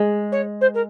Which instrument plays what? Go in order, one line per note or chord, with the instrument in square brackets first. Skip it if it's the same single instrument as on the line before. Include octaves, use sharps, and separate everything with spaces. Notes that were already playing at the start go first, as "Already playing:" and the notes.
Already playing: [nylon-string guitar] G#3
[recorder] C#5
C5
A#4